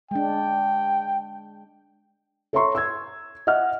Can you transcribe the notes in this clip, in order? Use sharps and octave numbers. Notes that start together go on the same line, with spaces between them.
G#3 D4 G5
A4 C#5 E5 A#5 C6 C#6
E6 G#6
D#5 E5 F#5 F6